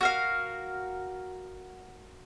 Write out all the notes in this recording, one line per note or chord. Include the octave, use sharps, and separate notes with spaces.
F#4 A#4 F5